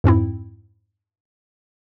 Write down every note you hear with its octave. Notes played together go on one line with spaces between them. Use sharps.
F2 G#2 C4 E4